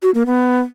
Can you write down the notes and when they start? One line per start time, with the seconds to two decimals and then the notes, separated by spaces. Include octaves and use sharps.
0.03 F#4
0.14 A#3
0.26 B3